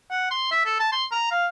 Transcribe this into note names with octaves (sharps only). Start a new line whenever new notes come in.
F#5
C6
E5
A4
A5
C6
A#5
F5